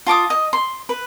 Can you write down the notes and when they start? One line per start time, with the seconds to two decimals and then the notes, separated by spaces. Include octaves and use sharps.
0.07 F4 A5 D6 D#6
0.30 D#5
0.53 C6
0.89 B4